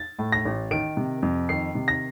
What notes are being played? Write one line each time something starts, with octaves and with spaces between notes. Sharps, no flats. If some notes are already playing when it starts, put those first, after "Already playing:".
Already playing: A6
A2
A#6
A1
D#3 D7
C3
F2
D#3 C7
C3
A#6